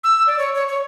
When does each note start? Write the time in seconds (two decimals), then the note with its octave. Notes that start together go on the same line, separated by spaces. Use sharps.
0.04 E6
0.27 D5
0.38 C#5
0.55 C#5
0.68 C#5